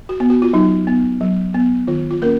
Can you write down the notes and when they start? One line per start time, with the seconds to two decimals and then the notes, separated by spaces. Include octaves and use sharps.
0.09 F#4
0.20 B3
0.30 F#4
0.42 F4
0.53 F#3 D#4
0.87 B3
1.21 F#3
1.54 B3
1.87 D#3 F4
2.11 F4
2.22 A#3 C#4 A#4